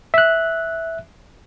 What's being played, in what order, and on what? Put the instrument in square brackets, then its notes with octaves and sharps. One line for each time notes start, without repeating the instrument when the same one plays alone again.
[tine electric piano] E5 F#6